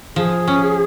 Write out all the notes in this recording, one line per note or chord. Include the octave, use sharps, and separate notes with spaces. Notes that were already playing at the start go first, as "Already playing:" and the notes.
F3 G#4
C#4